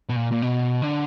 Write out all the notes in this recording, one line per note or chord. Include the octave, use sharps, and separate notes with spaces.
B2
A#2
A#2
B2
D3